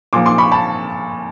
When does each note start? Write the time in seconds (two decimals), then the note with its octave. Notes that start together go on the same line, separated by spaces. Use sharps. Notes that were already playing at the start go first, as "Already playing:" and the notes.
0.13 A#2 F3 C6 D6
0.26 C6 D6
0.38 B5 C#6
0.52 A5 B5